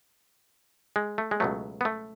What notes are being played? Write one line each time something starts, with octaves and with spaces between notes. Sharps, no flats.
G#3
A3
G#3
C#2 B2 F#3 A3
B3
A3